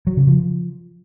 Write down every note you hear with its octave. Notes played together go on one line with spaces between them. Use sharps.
F#3
C#3
F3